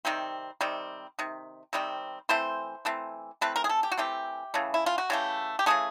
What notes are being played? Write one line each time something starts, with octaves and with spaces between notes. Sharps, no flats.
C3 D#3 G3 C4
C3 D#3 G3 C4
C3 D#3
C3 D#3 G3 C4
E3 A3 C4 C5
E3 A3 C4
E3 A3 C4 B4
A#4
G#4
A4
G4
F#4
E3 A3 C4 G4
C#3 E3 A3
E4
F4
F#4
C#3 E3 A3 G4
G4
C#3 E3 A3 G#4